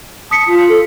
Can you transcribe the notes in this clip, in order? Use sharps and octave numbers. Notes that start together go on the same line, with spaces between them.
A5 D#6 B6 C#7
F4
A4